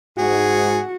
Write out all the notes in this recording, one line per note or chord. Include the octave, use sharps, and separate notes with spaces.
G#2 F#4 G#4